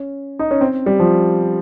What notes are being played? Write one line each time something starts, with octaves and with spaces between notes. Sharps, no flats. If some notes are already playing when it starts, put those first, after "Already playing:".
Already playing: C#4
D#4
C#4
C4
G3
F3